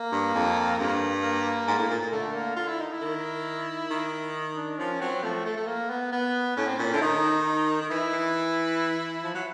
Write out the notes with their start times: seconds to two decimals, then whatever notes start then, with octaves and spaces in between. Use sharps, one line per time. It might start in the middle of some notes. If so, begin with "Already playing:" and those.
Already playing: A#3
0.12 G2
0.35 F2
0.79 G2
1.23 A#3
1.68 G#2
1.79 A2
1.90 A#2
2.01 A#2
2.12 D3 A3
2.34 A#3
2.56 F4
2.68 E4
2.80 D#4
2.92 E4
3.01 D#3
3.91 D#3
4.57 D4
4.79 F3 C#4
5.01 F#3 C4
5.24 F3 A3
5.46 A3
5.57 A3
5.67 A#3
5.90 B3
6.12 B3
6.57 A2 C#4
6.68 C4
6.79 A#2 C#4
6.93 D3 E4
7.01 D#3 D#4
7.81 D#3
7.90 E3 E4
8.12 E3
9.24 F3
9.34 F#3